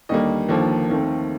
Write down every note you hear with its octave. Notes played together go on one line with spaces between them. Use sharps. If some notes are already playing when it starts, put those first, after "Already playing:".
D#2 D3 G3 A#3 D#5
D#2 D3 F3 A#3
D#2 D#3 A3 C4